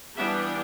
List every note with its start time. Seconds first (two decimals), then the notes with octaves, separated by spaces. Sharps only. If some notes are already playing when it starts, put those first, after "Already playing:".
0.17 E3 G3 B3 D4 E5